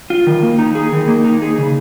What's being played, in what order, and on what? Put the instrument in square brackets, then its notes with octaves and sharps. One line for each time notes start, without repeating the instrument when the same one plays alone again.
[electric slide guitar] F4
D#3
A#3
D#4
G#4
D#3
A#3
D#4
G#4
C#3